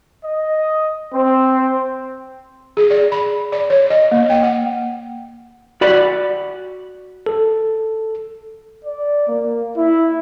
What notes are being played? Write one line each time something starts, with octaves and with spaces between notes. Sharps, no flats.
D#5
C4 C5
G#4
D5
B5
D5
C#5
D#5
A#3
G5
F#5
F#4 D5 B5
A4
D5
A#3
E4